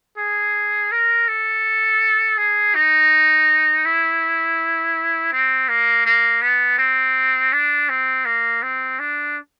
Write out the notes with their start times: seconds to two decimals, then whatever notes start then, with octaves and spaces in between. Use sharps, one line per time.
0.17 G#4
0.92 A#4
1.28 A4
2.38 G#4
2.75 D#4
3.85 E4
5.32 C4
5.69 A#3
6.06 A#3
6.42 B3
6.78 C4
7.53 D4
7.89 C4
8.25 A#3
8.63 C4
8.99 D4